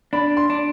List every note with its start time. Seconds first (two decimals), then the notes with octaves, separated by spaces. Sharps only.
0.13 D4 B5
0.37 C6
0.50 D4